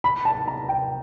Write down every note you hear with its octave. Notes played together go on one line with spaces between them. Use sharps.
B5
A5
A#5
G5